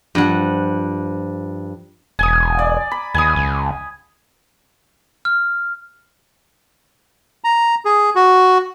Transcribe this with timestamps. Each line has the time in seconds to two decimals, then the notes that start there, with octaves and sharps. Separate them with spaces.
0.15 G2 F3 F#5
2.19 E1 G#5 D#6
2.59 D5
2.91 B5
3.15 D#2 G#5 D#6
3.36 C#2
5.25 F6
7.44 A#5
7.85 G#4
8.15 F#4